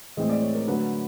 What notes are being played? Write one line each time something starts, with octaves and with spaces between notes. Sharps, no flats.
A2 E3 G#3 C4 D#5
D5
C#5
A#4
D3 F#3 A3 B4